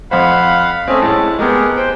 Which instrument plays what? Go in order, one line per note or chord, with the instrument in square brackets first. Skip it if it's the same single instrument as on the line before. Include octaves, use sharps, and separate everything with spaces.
[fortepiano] F2 C5 [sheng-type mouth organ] F5 F#5 B5
[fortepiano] A3 C4 [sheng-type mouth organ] C#4 D#5
[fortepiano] A2 G#3 [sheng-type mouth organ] A5
[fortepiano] G#3 B3 [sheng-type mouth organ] G4 G#4 A#4
[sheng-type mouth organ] C5 G5